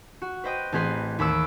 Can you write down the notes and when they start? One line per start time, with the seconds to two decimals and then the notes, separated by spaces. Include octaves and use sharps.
0.22 F#4
0.44 B4 C5 D#5 G5
0.72 A1 C4 G#4 B4 C6
1.19 D#2 B5 D6 E6 C#7